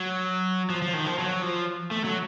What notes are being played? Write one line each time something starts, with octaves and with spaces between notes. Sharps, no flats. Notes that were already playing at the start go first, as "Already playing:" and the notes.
Already playing: F#3
F3
F3
D#3
F3
F#3
F3
A3
F#3